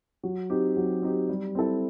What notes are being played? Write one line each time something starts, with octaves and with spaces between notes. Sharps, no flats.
F#3
C4 D#4 G4
F#3
C4 D#4 G4
G3
C4 E4 A4